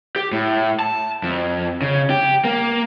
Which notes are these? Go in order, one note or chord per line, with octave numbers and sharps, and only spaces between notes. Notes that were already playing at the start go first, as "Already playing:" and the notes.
G4
A2
A5
F2
C#3
G4
A#3